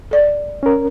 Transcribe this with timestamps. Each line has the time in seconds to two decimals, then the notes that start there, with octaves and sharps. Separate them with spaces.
0.11 A4 D5
0.63 C#4 A#4